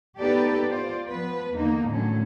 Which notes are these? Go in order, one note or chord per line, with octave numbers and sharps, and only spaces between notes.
B3 D#4 G4 A4 B4 D5
F4 C5 D5
F3 B3 B4
E2 D3 A#3 D#4
A2 D3 D#3 F#3 C#4